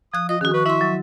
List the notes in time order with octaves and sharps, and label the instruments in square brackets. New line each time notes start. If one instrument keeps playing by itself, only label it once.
[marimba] F3 F#6 [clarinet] D#6
[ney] F4 [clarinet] D#5 [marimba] D#6
[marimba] D#3 F#4 [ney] C#4 [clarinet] G#4
[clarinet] B4 [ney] C#6
[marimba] E4 C6 [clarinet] E5
[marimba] F#3